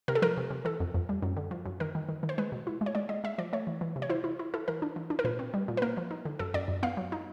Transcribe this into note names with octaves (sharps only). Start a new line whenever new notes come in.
C3 A#4
A4
F3 A#4
C3
C3
E3 A4
F2
F2
G3
F#2
D3
F3
F#2
D#3 A#4
D#3
D#3
D#3
C5
G#3 B4
B2
E4
G#3
C#5
G#3 D5
G#3 D#5
G#3 E5
F3 D5
A3 C#5
E3
E3
C3
C#5
E4 C5
E4
E4
E4 A4
E3 A#4
D4
E3
D4
A#4
A#2 B4
C4
G3
A#2
B4
A#3 A#4
F3
D#4
D3
F#2 A4
F#2 D5
F#2
B3 F5
F#3
D#4